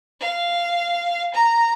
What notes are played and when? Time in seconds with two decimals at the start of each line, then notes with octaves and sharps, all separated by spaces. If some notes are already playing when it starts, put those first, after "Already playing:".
0.21 F5
1.34 A#5